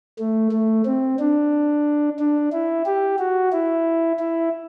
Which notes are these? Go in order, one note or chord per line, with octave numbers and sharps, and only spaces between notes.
A3
A3
C4
D4
D4
E4
G4
F#4
E4
E4